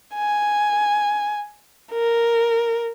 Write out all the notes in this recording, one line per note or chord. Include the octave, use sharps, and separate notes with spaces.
G#5
A#4